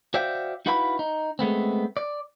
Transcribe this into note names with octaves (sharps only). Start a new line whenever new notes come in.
F#4 C5 D5 E5 F5 G5
D#4 E4 F#4 B4 F5 B5
D#4
G#3 A3 B3 C4
D5